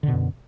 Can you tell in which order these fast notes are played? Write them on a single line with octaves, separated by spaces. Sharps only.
D3 B2 F#2